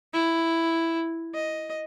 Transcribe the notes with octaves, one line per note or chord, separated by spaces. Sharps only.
E4
D#5